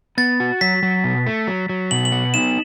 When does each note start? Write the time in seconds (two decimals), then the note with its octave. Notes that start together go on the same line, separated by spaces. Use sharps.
0.18 B3 A6
0.40 F#4
0.61 F#3 B6
0.83 F#3
1.04 B2
1.27 A3
1.47 F#3
1.69 F#3
1.91 B2 F#7
2.05 F#7
2.12 B3
2.34 D#4 E7